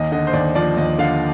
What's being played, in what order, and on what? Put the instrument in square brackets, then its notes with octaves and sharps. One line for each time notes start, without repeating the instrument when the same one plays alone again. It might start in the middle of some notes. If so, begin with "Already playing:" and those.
Already playing: [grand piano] D#2 D#5
D3 D#5
C5
D#2 D5
F3 D5
D#2 D#5
D3 F5